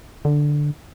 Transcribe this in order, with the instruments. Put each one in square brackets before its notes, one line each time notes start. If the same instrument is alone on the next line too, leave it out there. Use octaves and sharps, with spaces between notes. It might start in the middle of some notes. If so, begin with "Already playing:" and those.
[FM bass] D3